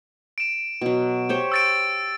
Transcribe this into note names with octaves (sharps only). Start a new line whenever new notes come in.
D7 E7
B2 F#3
G4 C5 C#5
E6 A6 D7